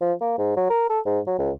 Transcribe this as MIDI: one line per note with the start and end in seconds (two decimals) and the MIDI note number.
0.01 0.13 53
0.21 0.38 58
0.38 0.54 44
0.56 0.69 54
0.70 0.85 70
0.90 1.00 69
1.06 1.20 44
1.27 1.35 54
1.39 1.51 37